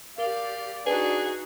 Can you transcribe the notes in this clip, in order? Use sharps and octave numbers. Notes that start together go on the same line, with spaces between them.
G4 A#4 D5 F5 G7
D4 D#4 F#4 G#4 B4